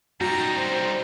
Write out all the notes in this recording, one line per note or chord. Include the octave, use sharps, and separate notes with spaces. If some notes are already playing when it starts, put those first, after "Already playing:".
G3 D#4 F#4 A#5
C5